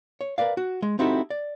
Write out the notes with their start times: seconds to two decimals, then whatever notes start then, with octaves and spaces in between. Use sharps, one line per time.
0.21 C#5
0.38 A#4 B4 D5 F5
0.57 F#4
0.82 G#3
0.99 C4 D#4 E4 F#4 G4 A4
1.30 D5